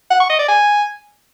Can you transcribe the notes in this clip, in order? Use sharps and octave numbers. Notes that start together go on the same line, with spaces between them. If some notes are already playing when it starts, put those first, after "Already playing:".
F#5
C#6
D#5
D5
G#5